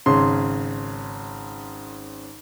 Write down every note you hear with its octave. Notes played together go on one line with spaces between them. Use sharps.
G#1 C#3 C6